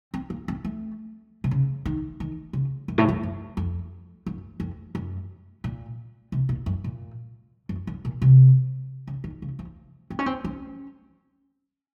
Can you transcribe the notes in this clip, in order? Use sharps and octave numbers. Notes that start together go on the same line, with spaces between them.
C4
A#3
C4
A3
C3
C#3
D#3
D#3
C#3
F#2
A2
F#2
F#2
F2
F#2
F2
F#2
A#2
C3
A#2
F#2
A#2
F#2
F#2
A#2
C3
C#3
D#3
C#3
F3
C4
C#4
C4
C#4